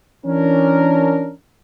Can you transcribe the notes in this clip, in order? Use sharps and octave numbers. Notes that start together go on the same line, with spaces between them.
E3 C#4 D4 A#4